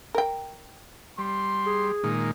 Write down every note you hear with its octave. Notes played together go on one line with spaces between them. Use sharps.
A#4 G5
G3 C6
G#4
A#2 D#3 G#3